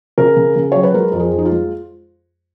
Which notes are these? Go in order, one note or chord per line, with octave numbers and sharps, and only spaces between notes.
C#3 A#4
C#3
C#3
F#3 C#5
B4
G#3 A#4
F2 A#4
G#4
F2
D#4
F4
G#3